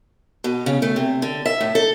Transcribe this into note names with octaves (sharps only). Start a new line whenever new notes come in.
B2
C#3
A3
C3
D3
E5
A2
A4